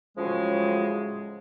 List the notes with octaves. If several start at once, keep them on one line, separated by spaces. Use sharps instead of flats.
A2 C#3 F3 F#3 G#3